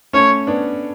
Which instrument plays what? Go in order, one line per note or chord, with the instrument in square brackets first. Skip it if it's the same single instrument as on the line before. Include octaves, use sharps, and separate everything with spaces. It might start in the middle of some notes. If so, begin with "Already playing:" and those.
[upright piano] A3 C#4 [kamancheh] C#5
[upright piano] B3 D4